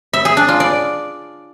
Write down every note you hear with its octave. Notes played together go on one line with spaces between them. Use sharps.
E5
G#4
D4
F4
D5